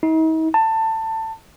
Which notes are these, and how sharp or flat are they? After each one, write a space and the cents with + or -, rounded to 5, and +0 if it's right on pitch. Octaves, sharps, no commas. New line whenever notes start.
D#4 +45
A5 +20